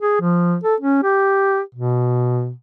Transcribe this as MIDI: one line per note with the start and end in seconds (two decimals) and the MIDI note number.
0.01 0.20 68
0.21 0.57 53
0.63 0.75 69
0.80 1.02 61
1.03 1.61 67
1.75 2.52 47